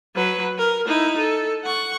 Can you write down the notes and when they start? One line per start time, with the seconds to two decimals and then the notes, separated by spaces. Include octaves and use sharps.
0.15 F#3 B4
0.58 A#4
0.87 D#4 E4
1.18 A4
1.64 F#5 C#6